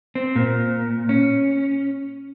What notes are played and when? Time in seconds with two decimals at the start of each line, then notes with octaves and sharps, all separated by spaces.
0.15 C4
0.36 A#2
1.09 C#4